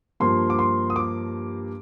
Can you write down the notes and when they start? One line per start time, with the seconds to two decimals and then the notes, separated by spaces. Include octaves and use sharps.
0.20 G2 F3 A#3 C6
0.50 D6
0.59 C6
0.90 D#6
0.96 D6